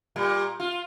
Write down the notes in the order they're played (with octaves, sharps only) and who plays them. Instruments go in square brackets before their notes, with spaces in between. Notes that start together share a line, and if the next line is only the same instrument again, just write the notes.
[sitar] A#2 G3
F4